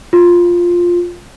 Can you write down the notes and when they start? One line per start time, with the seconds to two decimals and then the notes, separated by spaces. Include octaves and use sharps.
0.13 F4